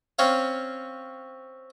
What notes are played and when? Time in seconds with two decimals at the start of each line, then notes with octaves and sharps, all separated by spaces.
0.19 C4 C#4 C#5 F5